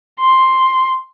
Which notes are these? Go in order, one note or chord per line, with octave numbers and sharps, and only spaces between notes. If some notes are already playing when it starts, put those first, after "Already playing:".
C6